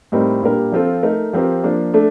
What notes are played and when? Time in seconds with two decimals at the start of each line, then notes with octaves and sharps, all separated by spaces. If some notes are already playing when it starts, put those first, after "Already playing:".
0.12 A2 G3 C4 D#4 A#4
0.43 A#2 G3 D4 G4 A#4
0.72 F3 C4 F4 A4
1.03 A3 D#4 A#4
1.33 F3 C4 G4 A#4
1.63 F3 A#3 D4
1.93 A3 D4 A4